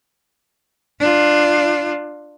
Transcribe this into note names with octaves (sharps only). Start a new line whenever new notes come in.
D4 F4